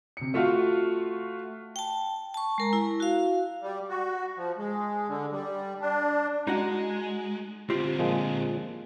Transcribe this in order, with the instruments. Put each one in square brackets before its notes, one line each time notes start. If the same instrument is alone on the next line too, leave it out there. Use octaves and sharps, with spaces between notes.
[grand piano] C3 C#7
A3 F4 F#4 F5
[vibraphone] G5 A5
A5 C#6
G#3 A#4 A#5
E4
F#4 F5
[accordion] G3
F#4
F3
G#3
D3
G3
D4
[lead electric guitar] G#3 [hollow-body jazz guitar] D#4 F#4 F#5
[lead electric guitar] D3 C4 [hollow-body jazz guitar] F4 G4
[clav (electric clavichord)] A#2 F3 G#3